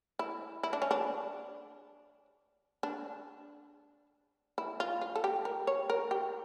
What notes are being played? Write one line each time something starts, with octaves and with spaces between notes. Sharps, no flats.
E4
E4
D4
C#4
D4
D4
E4
F4
F4
A4
G4
A#4
C#5
A#4
G4